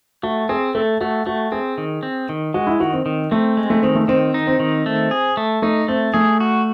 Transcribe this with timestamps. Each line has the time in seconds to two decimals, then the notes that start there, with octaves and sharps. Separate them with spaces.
0.23 A3 F#4
0.49 C4 G#4
0.75 A3 A4
1.01 A3 F#4
1.26 A3 F#4
1.52 C4 G#4
1.78 D#3
2.03 C4
2.29 D#3
2.54 G#3 F#4
2.67 E4
2.80 D#3 F#4
2.93 C4
3.06 D#3
3.31 A3 C4
3.57 G#3
3.70 A3
3.83 D#3 C4
3.95 A3
4.08 D#3 C4
4.34 D#4
4.47 C4
4.60 D#3
4.86 A3
5.11 G#4
5.37 A3
5.62 A3 D#4
5.88 A3 C4
6.14 A3 G#4
6.40 F#4